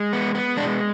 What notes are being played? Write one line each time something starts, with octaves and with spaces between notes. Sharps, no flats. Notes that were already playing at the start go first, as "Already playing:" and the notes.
Already playing: G#3
B3
B3
G#3 D4